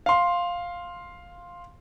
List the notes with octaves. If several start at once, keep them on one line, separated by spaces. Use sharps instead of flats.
F5 C6